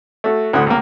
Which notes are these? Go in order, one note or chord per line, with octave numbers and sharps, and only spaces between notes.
A3 F#4
D2 A2 D3 F#5 D#6
C#2 A#3